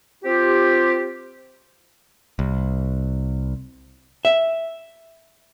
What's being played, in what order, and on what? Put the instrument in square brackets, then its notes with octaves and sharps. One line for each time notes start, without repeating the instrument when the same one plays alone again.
[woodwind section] C4 F4 G4
[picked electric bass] C2
[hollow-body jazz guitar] E5